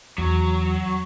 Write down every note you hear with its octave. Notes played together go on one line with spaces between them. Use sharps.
E2 F#3